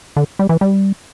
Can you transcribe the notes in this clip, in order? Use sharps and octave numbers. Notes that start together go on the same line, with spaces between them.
D3
G3
E3
G3